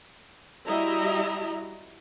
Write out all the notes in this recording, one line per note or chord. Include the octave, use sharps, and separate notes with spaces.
G3 E4 F#4 D#5 E5 A#5